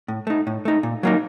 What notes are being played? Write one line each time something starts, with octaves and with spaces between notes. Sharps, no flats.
A2
A3 D#4
A2
A3 D#4
A#2
F#3 A#3 D#4